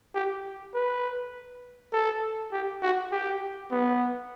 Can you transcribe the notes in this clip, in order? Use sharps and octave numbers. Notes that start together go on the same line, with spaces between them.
G4
B4
A4
G4
F#4
G4
B3